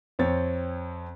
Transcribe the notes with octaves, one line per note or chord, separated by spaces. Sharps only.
F2 C4 C#5 A6